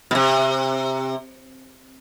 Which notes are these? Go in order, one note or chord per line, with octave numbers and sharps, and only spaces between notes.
B2
C3